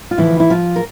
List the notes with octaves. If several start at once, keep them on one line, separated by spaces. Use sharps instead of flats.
F4
D2 D3 E3 F3 E4
E4
F3 F4
A#4